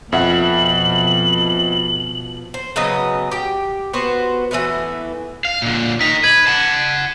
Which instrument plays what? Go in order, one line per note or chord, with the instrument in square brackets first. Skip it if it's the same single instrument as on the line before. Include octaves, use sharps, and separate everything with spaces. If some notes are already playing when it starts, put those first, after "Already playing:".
[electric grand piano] F2 E5 F#5 [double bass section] B2 F3 [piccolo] F#7
[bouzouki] C5
C#3 F#3 B3 D#5
G4 G5
B3 F#4 C5
E3 F3 A3 B3
[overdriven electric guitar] F5
A#2 D3
[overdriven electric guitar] D#4 A#4 [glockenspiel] B6
[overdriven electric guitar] B4 [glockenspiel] G#6 F#7
[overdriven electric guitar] F#5 A5